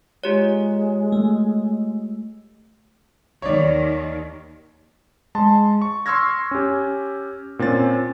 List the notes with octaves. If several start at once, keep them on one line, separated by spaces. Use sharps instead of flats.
G#3 F4 G4 C#5
A3
D#2 D#3 C#5 D5
G#3 A5 C6
C#6
C6 C#6 E6 F6 G#6 A#6
C#4 G4
A#2 C4 C#4 A6